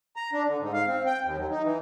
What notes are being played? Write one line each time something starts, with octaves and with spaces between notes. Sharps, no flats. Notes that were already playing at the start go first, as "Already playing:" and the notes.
A#5
D4
D3
G#2
F5
C4
G5
D#2
F#3
D#4
E3